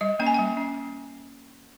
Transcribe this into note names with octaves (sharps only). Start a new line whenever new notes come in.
G3 D#5
A#3 C#4 G5
G#5
G3 G5
C#4